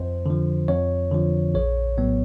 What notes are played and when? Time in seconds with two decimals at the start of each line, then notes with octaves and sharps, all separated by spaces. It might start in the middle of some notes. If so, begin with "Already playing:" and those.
Already playing: F2 C5
0.26 D3 F3
0.68 F2 C#5
1.11 D3 F3
1.54 A#1 C#5
1.98 A2 F#3 B3